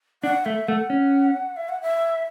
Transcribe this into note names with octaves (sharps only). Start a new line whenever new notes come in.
D4 F#5
A3 E5
A3 F#5
C#4
E5
F#5
E5